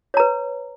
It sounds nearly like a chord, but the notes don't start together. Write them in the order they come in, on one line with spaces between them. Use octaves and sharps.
C#5 A#5 B4